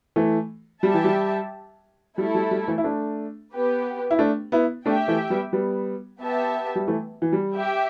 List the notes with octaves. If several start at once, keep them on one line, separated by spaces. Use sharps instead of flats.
E3 A3
G3 G4 E5 A5
E3
G3
G3 A3 E4 A4
G3
G3
E3 A3
E4
A3 D4
B3 G4 B4
E4
A3 D4
B3 E4
A3 D4 G4 E5 G5
E3 A3
G3 B3
G3 B3
B3 G4 E5 A5
G3
E3 A3
E3
G3
G4 E5 G5